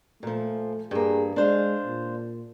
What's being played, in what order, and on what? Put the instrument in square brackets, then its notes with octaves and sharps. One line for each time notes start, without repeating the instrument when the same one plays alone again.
[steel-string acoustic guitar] A#2 F3 [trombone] A3
[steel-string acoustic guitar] G2 A#3 [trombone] G#4
[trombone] G#3 [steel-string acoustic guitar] D4 C5 F5
[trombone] A#2